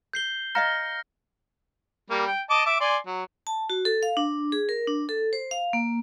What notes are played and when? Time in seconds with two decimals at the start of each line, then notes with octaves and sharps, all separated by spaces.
0.13 G6 C7 G7
0.55 D#5 F5 A#5 F6 A#6 C#7
2.10 G3 A#3
2.27 G5
2.50 D#5 A5 D6
2.66 E5 D6
2.81 D5 G#5 C6
3.07 F#3
3.47 A5
3.70 F#4
3.85 A4
4.03 F5
4.17 D4
4.52 G#4
4.69 A#4
4.88 D4
5.09 A4
5.33 C5
5.51 F5
5.73 A#3